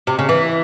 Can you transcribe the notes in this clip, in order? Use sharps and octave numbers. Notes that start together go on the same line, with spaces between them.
C3
C#3
E3